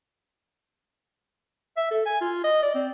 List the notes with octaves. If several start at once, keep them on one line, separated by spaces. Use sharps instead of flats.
E5
A4
G#5
F4
D#5
D5
C4